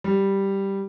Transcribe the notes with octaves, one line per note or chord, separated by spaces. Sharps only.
G3